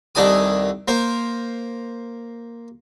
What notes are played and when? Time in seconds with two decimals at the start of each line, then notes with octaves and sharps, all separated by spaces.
0.15 C2 D#3 D4 A4 G#5 D#6
0.88 A#3 A#4 C5